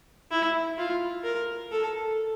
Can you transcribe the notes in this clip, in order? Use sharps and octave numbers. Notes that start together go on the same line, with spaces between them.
E4
F4
A#4
A4